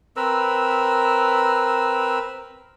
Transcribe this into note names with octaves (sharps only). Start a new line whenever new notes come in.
C4 A#4 B4 E6